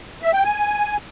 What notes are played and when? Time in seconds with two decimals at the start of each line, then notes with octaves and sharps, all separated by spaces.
0.22 E5
0.33 G5
0.44 G#5